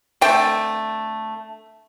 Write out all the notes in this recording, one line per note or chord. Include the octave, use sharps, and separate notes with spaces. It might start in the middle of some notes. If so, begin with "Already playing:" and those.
D3 A3 C4 G5